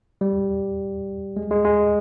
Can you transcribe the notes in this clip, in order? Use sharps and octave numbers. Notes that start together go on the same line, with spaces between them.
G3
G#3
G#3
G#3